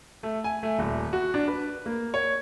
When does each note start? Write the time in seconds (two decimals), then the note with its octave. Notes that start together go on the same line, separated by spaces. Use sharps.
0.23 A3
0.44 G#5
0.63 A3
0.79 D#1
1.13 F#4
1.34 D4
1.48 B4
1.86 A#3
2.14 C#5